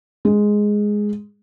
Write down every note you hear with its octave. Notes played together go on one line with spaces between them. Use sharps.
G#3